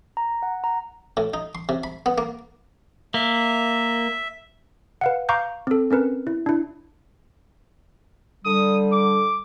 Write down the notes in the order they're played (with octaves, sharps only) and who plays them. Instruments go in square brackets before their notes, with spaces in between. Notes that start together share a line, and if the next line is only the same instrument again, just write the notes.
[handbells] A#5
F#5
A#5
[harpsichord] A2
D#4
C6
C3
B5
B3
A#3
[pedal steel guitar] A#3 [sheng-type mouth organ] E5
[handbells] B4 F5 F#5
F5 A#5 C#6 D6 G6
C4 A4
C4 C#4 A#4 B4
E4
D4 E4
[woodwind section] D3 G3 [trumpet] D#6
[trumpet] D6